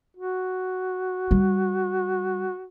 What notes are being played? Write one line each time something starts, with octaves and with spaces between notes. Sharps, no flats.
F#4
G3